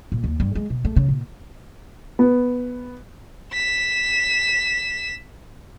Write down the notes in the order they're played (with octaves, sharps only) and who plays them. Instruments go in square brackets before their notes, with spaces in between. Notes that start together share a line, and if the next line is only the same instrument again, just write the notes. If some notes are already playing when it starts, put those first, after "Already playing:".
[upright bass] A#2
D#2
G2
G#3
B2
A3
C#3
A#2
[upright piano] B3
[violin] B6 E7